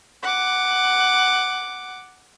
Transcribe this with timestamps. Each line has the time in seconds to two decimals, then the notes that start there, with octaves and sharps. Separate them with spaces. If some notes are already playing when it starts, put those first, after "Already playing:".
0.23 F#5 D6